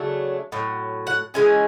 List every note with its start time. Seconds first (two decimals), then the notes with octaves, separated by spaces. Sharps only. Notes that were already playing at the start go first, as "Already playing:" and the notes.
Already playing: C#3 F#3 A3 D4
0.52 A2 F#3
1.07 F#5
1.34 E3 G#3 C#4 G#5